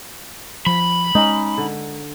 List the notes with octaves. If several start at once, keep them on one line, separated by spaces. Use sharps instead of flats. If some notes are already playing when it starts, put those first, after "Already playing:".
F3 B5
G#3 C#4 D#4
D3